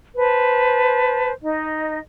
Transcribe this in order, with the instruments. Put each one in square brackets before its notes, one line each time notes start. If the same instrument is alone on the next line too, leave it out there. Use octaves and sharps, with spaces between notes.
[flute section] B4 C5 A5
D#4 D#5